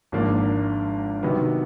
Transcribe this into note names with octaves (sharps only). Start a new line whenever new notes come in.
G#1 G#2 F3 A#3 D4
C3 D#3 F#3 B3